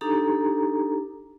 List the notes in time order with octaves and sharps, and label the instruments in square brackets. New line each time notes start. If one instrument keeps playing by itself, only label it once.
[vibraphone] D4 D#4 G4 A4 A#5